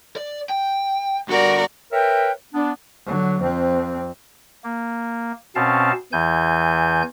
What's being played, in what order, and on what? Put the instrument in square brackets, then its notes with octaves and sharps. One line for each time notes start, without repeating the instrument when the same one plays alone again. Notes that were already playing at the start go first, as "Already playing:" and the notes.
[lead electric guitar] D5
G5
[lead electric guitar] G2 D3 [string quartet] F#4 A#4 D5
[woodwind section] A#4 B4 C#5 E5 G5
B3 D4
[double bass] D3 F#3
F2 C4
[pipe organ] A#3
B2 C4 C#4 F5 A5
E2 E3 G#5 G6